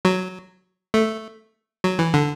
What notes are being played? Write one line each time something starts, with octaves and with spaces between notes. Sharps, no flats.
F#3
A3
F#3
E3
D3